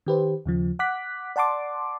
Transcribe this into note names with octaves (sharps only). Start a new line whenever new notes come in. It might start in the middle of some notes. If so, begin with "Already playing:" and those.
D#3 G4 B4 C5
D#2 C#3 F3
F#5 D6 F#6 B6
D5 F#5 A5 C6 D6